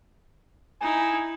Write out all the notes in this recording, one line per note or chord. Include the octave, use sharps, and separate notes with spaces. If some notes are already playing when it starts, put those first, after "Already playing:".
D#4 E4 G#5